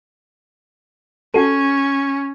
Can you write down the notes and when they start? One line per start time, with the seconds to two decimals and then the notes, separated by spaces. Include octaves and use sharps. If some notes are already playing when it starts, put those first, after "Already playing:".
1.34 C#4 F#4 A4